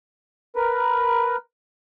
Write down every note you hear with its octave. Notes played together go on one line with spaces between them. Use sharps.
A#4 B4